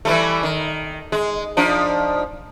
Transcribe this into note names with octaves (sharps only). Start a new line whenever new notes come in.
E3 G3 A3
D#3
G#3
F3 D4 D#4